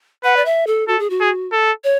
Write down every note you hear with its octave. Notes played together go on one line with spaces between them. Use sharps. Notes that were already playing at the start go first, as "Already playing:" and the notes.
B4 F#5
D5
E5
A4
F#4 A4
G#4
F#4
G#4
A4
C#5